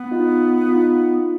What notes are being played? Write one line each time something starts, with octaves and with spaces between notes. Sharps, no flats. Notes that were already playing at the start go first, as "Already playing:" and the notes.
Already playing: B3
D#4 F4
D#4 F4